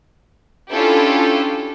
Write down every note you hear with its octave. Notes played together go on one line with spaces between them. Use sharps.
C#4 D4 E4 F4 G4 A4